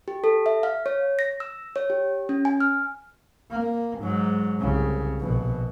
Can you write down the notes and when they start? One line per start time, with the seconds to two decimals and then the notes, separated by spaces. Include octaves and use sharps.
0.08 G4
0.24 A4
0.46 E5
0.63 F5
0.86 C#5
1.19 A#6
1.40 E6
1.76 C#5
1.90 G4
2.29 C#4
2.45 G#5
2.61 F6
3.51 A#3
3.99 G#2 F#3
4.60 C2 C#3
5.21 A#1 B2